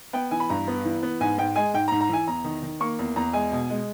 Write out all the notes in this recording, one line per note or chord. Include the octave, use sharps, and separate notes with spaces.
B3 G5
E3 G#5
B5
G2 A#5
B3
E3
B3
G#2 G#5
G#2 G5
G#3 G#5
G#2 G5
A#5
G#2
A#5
E3 G#5
E2 A#5
D#3
D#3
A#3 C#6
E2
E2 A#5
G#3 G#5
B2
G#3